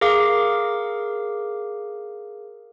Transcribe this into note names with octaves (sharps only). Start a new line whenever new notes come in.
G#4 A#4 F5 D6